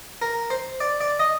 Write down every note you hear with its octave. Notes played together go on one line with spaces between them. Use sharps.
A#4
C5
D5
D5
D#5